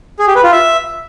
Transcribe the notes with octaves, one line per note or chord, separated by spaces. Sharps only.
G#4
G4
B4
F4
E5